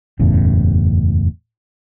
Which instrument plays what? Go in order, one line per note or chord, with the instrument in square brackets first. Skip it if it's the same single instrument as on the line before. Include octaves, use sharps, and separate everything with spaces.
[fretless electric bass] F#1 E2 A2 C#3